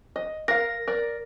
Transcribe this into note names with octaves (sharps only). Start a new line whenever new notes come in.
D#5
A#4 F5 A#6
A#4 D5